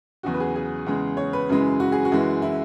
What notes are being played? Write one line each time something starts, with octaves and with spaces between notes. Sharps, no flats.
E2 C#3 F#3 F#4
B4
G#4
G#4
E2 C#3 G#3
C#5
B4
F#2 C#3 E3 G#3
F#4
G#4
F#4
F#2 E3 G#3
E4